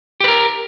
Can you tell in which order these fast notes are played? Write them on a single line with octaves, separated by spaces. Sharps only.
G4 B4 A#4